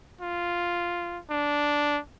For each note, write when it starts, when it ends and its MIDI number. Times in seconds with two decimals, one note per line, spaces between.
0.21 1.19 65
1.30 2.00 62